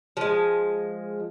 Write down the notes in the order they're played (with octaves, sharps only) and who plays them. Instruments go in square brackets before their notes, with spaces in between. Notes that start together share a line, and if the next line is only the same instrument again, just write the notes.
[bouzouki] F3 G#3